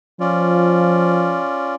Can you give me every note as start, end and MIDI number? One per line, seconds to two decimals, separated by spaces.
0.20 1.43 53
0.20 1.75 61
0.20 1.75 65
0.20 1.75 74